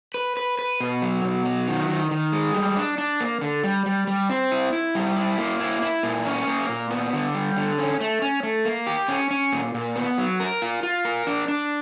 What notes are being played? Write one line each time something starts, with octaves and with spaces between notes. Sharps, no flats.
B4
B4
B4
B2
F#3
B2
F#3
D#3
D#3
D#3
G#3
G3
D4
D4
A#3
D3
G3
G3
G3
C4
E4
E4
G3
E4
A#3
E4
E4
A#2
C#4
A#3
A#2
B3
D3
G3
D3
C#4
A3
C#4
A3
A#3
G4
C#4
C#4
A#2
A#2
B3
F#3
A#4
F4
F4
A#4
D4
D4